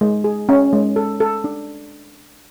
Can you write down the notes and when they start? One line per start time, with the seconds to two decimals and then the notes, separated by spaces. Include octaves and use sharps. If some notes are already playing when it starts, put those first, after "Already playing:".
0.01 G#3
0.24 G#4
0.49 C#4
0.73 G#3
0.96 A4
1.20 A4
1.44 D4